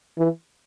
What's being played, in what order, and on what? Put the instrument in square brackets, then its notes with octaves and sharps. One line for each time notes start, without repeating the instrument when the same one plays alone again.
[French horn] E3